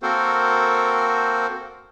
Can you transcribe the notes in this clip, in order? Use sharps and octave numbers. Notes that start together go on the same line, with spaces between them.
A#3 C4 F#4 A4 A#4 C5